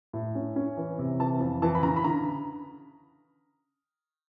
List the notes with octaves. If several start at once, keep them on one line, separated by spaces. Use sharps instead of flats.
A2
C#4
C#4
E3
C3
E3 A5
F2
E3 A5
B5
C#3 A#5
B5
D3 A#5